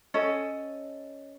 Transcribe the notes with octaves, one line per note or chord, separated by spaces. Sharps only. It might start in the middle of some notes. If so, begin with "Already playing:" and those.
C#4 A4 D#5